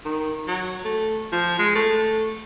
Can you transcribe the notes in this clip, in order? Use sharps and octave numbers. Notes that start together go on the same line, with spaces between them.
D#3
F#3
A3
F3
G#3
A3